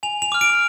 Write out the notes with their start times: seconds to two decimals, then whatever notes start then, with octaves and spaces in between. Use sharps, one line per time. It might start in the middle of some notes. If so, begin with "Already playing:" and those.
0.03 G#5 F7
0.22 F7
0.32 D6 F6
0.41 D7